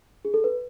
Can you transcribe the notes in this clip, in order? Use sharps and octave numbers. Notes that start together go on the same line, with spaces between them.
G#4
A4
B4